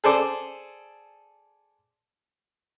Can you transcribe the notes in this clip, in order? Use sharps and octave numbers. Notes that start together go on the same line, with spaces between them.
G#4 A4 C5 D5